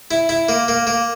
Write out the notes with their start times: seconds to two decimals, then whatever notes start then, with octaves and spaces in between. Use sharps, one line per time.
0.11 E4
0.29 E4
0.49 A#3
0.68 A#3
0.87 A#3